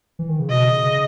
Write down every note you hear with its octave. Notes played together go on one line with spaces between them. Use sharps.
E3
D#3
C#3
B2 D#5
C#3
C#3